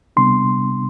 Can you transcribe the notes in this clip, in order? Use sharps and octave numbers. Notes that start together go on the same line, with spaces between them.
C3 G3 B3 D4 C6